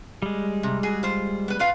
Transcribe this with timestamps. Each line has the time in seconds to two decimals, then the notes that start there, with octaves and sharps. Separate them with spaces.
0.22 G3 G#3
0.63 C3
0.83 F#4 G#4
1.03 F4 C5
1.48 B3 B4
1.59 F4 B4 F5